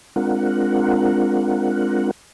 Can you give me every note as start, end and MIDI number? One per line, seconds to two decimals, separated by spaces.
0.16 2.11 56
0.16 2.11 60
0.16 2.11 62
0.16 2.11 65
0.16 2.11 70
0.16 2.11 78